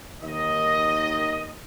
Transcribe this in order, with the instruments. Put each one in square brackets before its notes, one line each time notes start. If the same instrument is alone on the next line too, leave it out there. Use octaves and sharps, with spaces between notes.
[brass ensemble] D#2 D#3 D#5